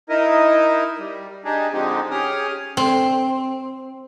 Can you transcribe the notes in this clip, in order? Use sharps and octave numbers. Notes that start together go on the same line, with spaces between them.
D#4 E4 A#4 D#5
G3
D4 D#4 G4 G#4
D3 F3 G#3 C4 D#4 G4
C#4 G4 G#4 G5 D#6 F6
C4